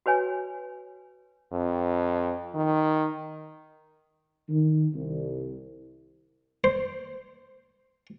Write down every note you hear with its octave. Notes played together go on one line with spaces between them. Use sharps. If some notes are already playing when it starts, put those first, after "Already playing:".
F#4 B4 C#5 G#5
F2
D#3
D#3
C2
C5